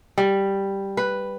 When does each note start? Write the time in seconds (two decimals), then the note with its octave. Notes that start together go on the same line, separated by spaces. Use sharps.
0.18 G3
0.97 B4